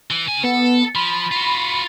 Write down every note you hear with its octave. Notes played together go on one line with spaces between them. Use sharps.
E3
C#3 G#5
B3 A4
F3 B5
F4 F#4